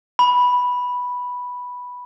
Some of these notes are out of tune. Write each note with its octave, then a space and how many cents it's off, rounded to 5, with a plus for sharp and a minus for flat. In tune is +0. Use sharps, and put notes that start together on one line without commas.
B5 -5